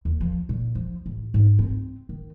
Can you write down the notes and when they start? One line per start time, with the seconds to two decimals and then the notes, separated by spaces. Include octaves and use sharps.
0.05 D#2
0.21 F3
0.49 A#2
0.75 F3
1.06 A1
1.34 G#2
1.59 C4
2.09 D#3